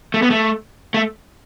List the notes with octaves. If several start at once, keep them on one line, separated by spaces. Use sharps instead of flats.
A3
B3
A3
A3